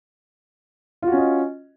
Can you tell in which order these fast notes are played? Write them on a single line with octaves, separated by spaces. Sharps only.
F4 F#4 C#4 D#5